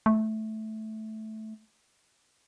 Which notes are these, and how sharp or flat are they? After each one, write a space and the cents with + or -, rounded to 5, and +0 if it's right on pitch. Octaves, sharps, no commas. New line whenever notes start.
A3 -10